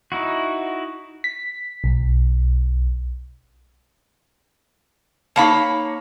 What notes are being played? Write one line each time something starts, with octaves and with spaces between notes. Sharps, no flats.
D#4 E4 F#4
B6
B1
A#3 D#4 C#5 F5 A5 B5